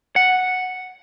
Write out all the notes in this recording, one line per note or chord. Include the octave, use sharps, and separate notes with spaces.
F#5